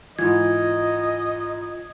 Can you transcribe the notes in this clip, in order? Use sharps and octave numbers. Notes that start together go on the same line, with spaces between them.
G#2 E3 F4 D#5 G#6